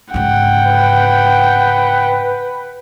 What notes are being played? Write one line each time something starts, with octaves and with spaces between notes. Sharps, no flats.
G#2 C#3 F#5 G5
B4